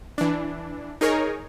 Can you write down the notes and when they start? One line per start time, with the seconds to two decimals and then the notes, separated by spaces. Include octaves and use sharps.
0.18 E3 D4
1.01 D#4 G#4 A#4 C#5